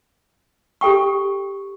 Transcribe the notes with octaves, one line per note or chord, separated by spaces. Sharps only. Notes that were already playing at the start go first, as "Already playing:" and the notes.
G4 A4 G5 C#6